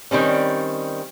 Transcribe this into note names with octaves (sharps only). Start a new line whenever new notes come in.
D#3 G3 C4 C#4